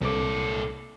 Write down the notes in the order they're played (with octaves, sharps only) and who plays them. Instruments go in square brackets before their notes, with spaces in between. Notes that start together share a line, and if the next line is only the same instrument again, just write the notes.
[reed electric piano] C2 D6 [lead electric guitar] A#2 A4